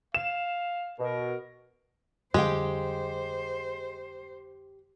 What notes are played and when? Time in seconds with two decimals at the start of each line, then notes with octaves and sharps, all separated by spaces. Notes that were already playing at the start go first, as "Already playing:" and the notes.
0.15 F5 E7
0.99 B2 A#4
2.34 F2 D3 G3 G#3 G4 C5 F5 G5